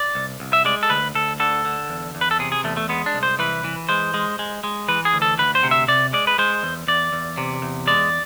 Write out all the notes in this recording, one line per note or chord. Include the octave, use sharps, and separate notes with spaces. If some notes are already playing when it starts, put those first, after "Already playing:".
Already playing: D5
C2
C2
E5
G#3 D5
A4
D2 B4
D2 A4
D3 A4
D3
E2
E2
B4
A4
C3 G#4
G#4
E2 A3
A3
G#3 B3
D4
C2
C5
E3 B4
E3
G#3 C5
G#3
G#3
G#3
E3 B4
G#4
D2
A4
D2 B4
C5
C3
E5
C3 D5
G#3 D5
B4
G#3 C5
E2
E2 D5
E2
C3
E2
G#3 D5